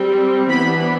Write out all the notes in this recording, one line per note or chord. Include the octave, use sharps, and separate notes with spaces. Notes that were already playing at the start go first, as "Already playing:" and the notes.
Already playing: G3 C4
E3 B3 D4 B5